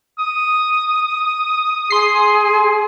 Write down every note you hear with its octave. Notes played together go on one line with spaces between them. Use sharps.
D#6
G#4 C6 C7